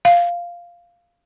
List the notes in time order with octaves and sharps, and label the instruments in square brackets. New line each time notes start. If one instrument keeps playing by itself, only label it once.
[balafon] F5